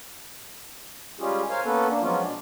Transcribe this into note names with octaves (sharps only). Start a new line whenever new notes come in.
G3 G#3 C#4 F4 G4 G#4
A#4 C5 C#5 F5 G#5
A#3 B3 C#4 A4 B4
A#3 D4
F3 F#3 G#3 B3 C#4 F4
B2 D4 D5